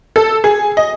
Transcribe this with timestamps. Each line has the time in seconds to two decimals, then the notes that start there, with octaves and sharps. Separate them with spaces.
0.16 A4
0.44 G#4
0.77 D#5